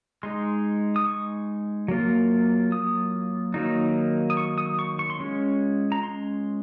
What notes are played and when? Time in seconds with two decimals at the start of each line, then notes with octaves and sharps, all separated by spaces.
0.23 G#3 D#4 C6
0.96 D#6
1.06 C#6
1.88 F#3 A#3 F4
2.72 D#6
3.54 D#3 F#3 A#3 D#4
4.30 D#6
4.37 C#6
4.58 D#6
4.79 C#6
4.99 C#6
5.10 C6
5.20 G#3 C#4 F4 C#6
5.92 A#5
6.03 C6